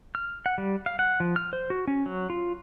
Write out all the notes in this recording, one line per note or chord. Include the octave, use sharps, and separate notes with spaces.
F6
F#5
G3
F5
F#5
F3
F6
C5
F#4
C#4
F#3
F4